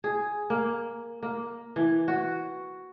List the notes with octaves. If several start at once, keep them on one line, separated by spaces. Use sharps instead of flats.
G#4
A#3
A#3
E3
F#4